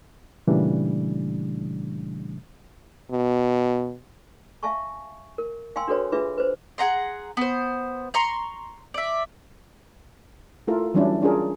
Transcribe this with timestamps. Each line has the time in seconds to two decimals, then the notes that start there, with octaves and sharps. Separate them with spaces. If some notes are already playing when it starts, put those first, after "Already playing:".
0.47 A#2 C#3 E3 G3 A3 D4
3.11 B2
4.63 E5 F5 G#5 A5 C#6
5.38 A#4
5.76 F5 G5 G#5 C6 E6
5.88 D4 F#4 A4 B4 C#5
6.12 D4 F4 G#4 B4 E5
6.38 B4 C5
6.78 G#4 F#5 A#5 C6
7.37 B3 C5
8.14 A#5 C6 C#6
8.94 D5 E5
10.67 A3 E4 F4 A4 A#4
10.94 E3 F#3 G3 C#4 D4 E4
11.21 C#4 D4 F4 G#4 A#4